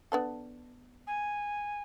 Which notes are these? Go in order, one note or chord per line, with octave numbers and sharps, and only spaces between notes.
B3 D4 A4
G#5